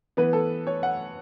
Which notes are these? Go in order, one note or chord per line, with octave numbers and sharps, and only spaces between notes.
E3 B3 B4
A4
C#5
F#5